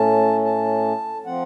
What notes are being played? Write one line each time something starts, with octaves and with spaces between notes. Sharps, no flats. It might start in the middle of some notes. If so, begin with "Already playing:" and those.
Already playing: A2 A3 C#4 A5
A5
F3 C4 F#5